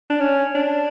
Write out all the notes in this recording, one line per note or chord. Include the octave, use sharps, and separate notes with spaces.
D4
C#4
D4